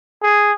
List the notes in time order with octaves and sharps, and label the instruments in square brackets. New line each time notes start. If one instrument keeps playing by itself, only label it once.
[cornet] G#4